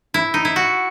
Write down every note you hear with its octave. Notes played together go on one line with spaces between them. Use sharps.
E4
D#4
E4
F#4